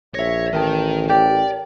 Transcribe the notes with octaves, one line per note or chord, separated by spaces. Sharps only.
A#1 C#5 E5 A#6
A1 D#3 A#4 G5 A5
G4 D5